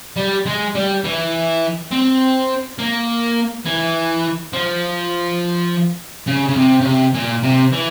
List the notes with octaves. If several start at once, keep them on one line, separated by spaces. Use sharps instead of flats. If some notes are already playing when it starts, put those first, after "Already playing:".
G3
G#3
G3
E3
C4
A#3
E3
F3
C#3
C#3
C3
C#3
C3
A#2
C3
E3